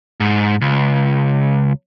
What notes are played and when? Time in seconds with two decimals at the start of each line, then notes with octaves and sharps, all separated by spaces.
0.20 G#2
0.61 C#2